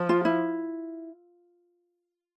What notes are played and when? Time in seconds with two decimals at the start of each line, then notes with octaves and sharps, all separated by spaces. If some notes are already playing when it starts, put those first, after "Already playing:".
Already playing: F3
0.09 F4
0.25 E4